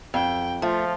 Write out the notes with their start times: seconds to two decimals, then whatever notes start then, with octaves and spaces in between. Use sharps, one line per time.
0.14 F2 G5
0.62 F3 A3 F4